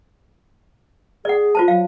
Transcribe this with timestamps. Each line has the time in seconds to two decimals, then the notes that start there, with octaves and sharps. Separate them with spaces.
1.25 G#4 D5 F#5
1.55 F4 C5 A5
1.68 F#3 F5